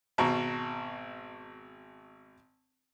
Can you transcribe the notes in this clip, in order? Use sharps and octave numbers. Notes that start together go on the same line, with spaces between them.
G#1 B2 A#5 C#6